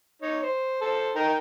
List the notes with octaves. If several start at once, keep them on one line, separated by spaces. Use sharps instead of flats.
D#4 C#5
C5
A4 C5
D#4 A#4 G5